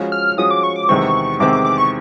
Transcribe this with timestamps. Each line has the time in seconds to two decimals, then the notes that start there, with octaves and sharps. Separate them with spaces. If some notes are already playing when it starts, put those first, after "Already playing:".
Already playing: F3 G#3 C#4 F#4
0.12 F6
0.37 F3 G#3 C#4 F#4 D#6
0.51 D6
0.63 C#6
0.76 D6
0.89 E2 C3 D#3 G#3 C4 C#6
1.40 E2 C3 D#3 G#3 C4 D6
1.53 D6
1.65 D6
1.78 C#6